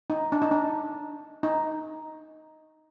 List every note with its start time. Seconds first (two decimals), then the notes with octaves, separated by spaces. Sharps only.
0.10 D#4
0.32 D4
0.42 D#4
0.51 D4
1.43 D#4